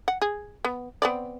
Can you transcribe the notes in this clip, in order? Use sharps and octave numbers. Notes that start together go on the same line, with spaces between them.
F#5
G#4
B3
B3 C4 D5